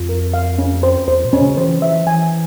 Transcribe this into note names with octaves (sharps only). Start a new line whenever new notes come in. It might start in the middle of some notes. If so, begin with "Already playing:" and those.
Already playing: F2 F4
A#4
F5
C#4
C5
E2 C5
A#2
C#4
C#3
E3 C5
E3 E5
E3 G#5